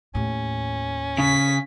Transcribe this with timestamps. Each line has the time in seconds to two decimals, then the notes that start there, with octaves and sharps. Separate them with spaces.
0.15 D#2 A2 C#4
1.18 C#3 B6